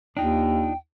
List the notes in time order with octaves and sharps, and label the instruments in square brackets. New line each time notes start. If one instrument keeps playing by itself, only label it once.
[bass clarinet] D#2 [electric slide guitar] D4 D#4 F4 [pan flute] G5